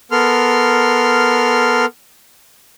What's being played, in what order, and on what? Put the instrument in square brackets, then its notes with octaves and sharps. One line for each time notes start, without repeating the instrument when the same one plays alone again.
[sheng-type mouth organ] B3 A4 A#4 C6 F6